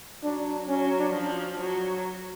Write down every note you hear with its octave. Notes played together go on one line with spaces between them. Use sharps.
F#3 D4
F#3 C#4
D4
F3
F#3